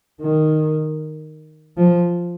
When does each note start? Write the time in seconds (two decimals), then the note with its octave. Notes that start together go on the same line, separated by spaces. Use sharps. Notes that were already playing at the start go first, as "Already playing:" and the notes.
0.21 D#3
1.77 F3